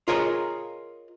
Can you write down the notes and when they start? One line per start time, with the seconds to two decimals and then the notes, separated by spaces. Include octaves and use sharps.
0.08 F4 G#4 A#4 C#5 D#5